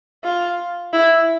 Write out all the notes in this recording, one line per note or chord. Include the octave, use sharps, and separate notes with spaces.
F4
E4